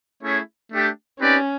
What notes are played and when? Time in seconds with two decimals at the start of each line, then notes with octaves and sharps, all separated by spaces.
0.22 A3 C#4 E4 G#4 C#5
0.71 A3 D4 G4
1.20 C4 C#4 D#4 G4 B4 D5